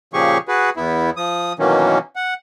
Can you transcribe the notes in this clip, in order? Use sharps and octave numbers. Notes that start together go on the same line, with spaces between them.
A#2 C#3 F3 G4 G#4 C#6
F#4 G#4 B4
E2 B3 E4
F3 D#6
B2 D#3 E3 F#3 A#3 C#4
F#5